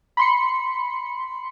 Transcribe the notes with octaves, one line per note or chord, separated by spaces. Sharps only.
B5 C6 C#7